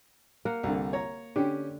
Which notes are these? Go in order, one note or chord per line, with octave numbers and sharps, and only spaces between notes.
A#3 A#4 F#5
C2 D3
C#5 A#5
D3 C#4 G4